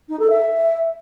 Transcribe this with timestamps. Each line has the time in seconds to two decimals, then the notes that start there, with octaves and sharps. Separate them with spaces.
0.08 D#4
0.19 A4
0.30 E5